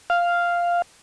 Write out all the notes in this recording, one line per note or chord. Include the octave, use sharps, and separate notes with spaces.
F5